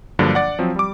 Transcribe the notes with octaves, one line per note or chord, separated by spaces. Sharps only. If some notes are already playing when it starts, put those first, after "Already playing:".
G2 D3 F3 F#3 A#3 D4
D5 F#5
F3 F#3 C4
G3 D6